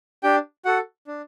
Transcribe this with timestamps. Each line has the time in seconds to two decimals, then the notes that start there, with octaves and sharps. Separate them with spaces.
0.23 D4 G4 G5
0.65 F#4 A4 F#5
1.07 D4